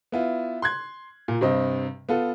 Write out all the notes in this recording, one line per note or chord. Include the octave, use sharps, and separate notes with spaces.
B3 E4 F4
C6 F#6 G#6
A#2
G2 C3 C4 D#5
B3 F4 A4